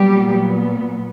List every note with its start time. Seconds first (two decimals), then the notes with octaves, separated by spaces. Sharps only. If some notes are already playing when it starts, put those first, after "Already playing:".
Already playing: A#2 F#3 G3 B3 G4